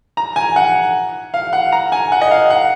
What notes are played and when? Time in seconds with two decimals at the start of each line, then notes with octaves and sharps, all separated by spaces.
0.17 A#5
0.36 G#5
0.56 F#5
1.34 F5
1.53 F#5
1.72 A#5
1.92 G#5
2.12 F#5
2.21 D#5
2.31 F5
2.50 F#5